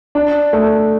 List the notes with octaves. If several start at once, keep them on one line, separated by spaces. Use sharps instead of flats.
D4
A3